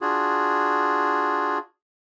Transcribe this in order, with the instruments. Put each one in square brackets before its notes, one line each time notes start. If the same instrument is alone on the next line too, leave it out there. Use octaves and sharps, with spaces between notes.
[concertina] D4 F4 F#4 G#4